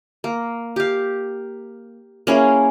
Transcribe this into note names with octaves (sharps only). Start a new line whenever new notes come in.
A#3
G4 F5
A#3 C#4 E4 G#4